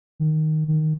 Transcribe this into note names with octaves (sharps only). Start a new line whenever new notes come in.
D#3
D#3